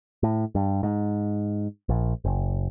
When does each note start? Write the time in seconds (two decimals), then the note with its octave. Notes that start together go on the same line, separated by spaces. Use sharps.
0.23 A2
0.55 G2
0.83 G#2
1.89 A#1
2.25 F#1